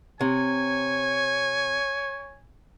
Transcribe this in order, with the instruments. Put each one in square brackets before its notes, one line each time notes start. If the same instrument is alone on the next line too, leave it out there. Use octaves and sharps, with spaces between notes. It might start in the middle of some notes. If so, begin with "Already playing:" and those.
[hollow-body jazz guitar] C3 [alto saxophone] C#5 [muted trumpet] G#5